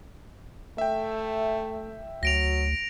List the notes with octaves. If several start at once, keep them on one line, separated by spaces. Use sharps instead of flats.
A3 E5 G5
D2 F#3 A#6 D7 F7